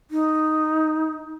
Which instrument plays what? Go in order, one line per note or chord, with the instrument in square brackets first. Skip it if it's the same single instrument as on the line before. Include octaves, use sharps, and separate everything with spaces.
[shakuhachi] D#4